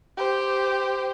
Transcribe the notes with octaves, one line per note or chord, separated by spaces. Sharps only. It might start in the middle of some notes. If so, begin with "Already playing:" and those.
G4 C5